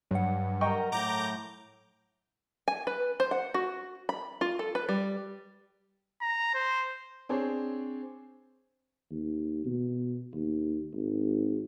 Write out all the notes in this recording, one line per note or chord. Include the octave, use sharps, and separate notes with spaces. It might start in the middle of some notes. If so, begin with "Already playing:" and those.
G2 F#3 F#5
A#4 D#5 G5 A#5 C#6
A2 A#5 D6 G6
G#5
B4
C5
F#5
F#4
B5
F4
A4
B4
G3
A#5
C5
C4 D4 G#4 C5 C#5
D#2
B2
D#2
G#1